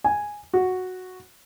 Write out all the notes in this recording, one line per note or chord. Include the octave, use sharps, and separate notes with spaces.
G#5
F#4